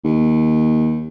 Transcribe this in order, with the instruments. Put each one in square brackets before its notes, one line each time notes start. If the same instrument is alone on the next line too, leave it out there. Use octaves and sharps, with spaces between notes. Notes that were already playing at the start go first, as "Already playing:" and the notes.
[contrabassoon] D#2